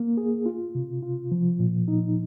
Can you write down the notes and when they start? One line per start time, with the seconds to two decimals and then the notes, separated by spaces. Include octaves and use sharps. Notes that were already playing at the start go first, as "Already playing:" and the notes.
Already playing: A#3
0.17 G#4
0.46 F4
0.75 C3
1.02 F4
1.32 F3
1.60 A#2
1.88 D#4